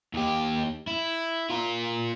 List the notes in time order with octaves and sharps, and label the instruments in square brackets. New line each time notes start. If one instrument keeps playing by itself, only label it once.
[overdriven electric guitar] D#2 G4
E4
F4 A#4